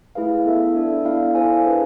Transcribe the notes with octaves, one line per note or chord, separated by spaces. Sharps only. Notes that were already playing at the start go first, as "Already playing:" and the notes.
A3 E4 G#4 B4 F5
B3 E4 A4 E5
D4 A4 D5
B3 E4 A4 D5 F5
E4 A4 C5 F5 G#5
D4 G#4 B4